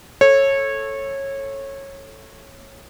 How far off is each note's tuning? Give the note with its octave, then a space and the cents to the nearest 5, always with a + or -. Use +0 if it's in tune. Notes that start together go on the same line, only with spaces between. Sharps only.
A4 +0 C#5 -20